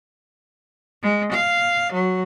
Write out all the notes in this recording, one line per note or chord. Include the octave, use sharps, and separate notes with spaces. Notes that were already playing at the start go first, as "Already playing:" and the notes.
G#3
F5
F#3